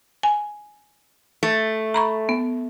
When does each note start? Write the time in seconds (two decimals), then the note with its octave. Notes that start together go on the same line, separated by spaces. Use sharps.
0.23 G#5
1.43 A3
1.94 A#5 B5 C#6
2.29 B3